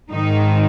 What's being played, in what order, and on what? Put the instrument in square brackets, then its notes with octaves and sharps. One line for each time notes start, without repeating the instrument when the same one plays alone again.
[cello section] G#2 D#3 D#4